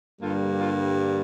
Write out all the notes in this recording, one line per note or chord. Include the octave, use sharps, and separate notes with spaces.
G2 D3 G3 A#3 F4 A4
F4 A4